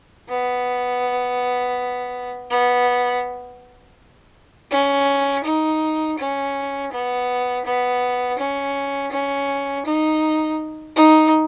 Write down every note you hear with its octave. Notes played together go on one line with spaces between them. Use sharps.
B3
B3
C#4
D#4
C#4
B3
B3
C#4
C#4
D#4
D#4